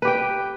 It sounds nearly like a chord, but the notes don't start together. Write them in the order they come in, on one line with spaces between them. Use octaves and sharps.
B4 G4 G5